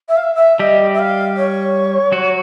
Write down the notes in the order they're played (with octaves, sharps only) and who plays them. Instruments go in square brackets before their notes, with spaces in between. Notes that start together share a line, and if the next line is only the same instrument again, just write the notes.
[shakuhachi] E5
F5
E5
E5
[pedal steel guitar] G3 G4 [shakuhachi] D#5
[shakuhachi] E5
F5
C#5
[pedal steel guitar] F#3 F#4